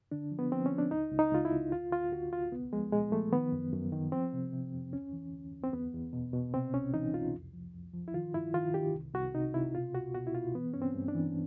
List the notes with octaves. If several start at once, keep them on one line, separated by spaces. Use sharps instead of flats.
D3 D4
F3
B3
F3 C4
C#4
F3
D4
C#2 D#4
C#2
D#4
C#2 F4
E4
C#2
D2 F4
D2 F4
D2 F#4
D2 F4
C2 B3
F3 G#3
A#2 G#3
F3 A3
D#3 B3
F#2
F#2
D#3
F3 C4
C3
C3
F2
D2 C#4
E3
D2
D2
C4
E2 B3
E2
B2
B2
C3 C4
C2 C#4
E3 D#4
C2 F4
F2
F3
F2
F3
E4
D#3 F4
G2 E4
D#3 F4
D#3 G4
C2
C2 F#4
C3 D#4
C3 E4
B2 F4
C#2 F#4
B2 F#4
E4
B2 F4
E3 B3
G2 C#4
C4
G2
D4
E3